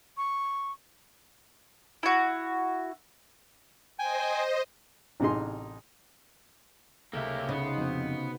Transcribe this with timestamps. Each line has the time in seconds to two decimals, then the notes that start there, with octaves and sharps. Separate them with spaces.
0.17 C#6
2.03 E4 F#4
3.99 C5 D#5 G5 G#5
5.20 A1 C3 D#4 G#4 C6
7.13 C#2 C3 A#3 G4 A4 E5 B6
7.49 C#3 B3 D#4
7.63 C5
7.77 F2 C4 D#4 F#4